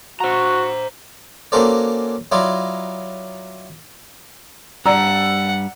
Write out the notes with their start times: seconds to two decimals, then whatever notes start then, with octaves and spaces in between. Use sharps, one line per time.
0.20 F#4 C5 A#5
1.52 A#3 C#4 F#4 A4 C5 D5
2.32 F#3 E4 F4 D5 D#5
4.86 G2 G3 D5 F#5 A#5 E6